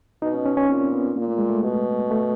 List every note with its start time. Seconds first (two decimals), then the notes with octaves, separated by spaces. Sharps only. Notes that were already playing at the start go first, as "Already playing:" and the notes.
0.22 B2 D#4
0.34 C#4
0.46 C#4
0.57 C#4
0.69 A#2 C4
0.93 B3
1.16 A#2 A#3
1.28 A3
1.38 G#3
1.49 A3
1.63 B2
2.11 A3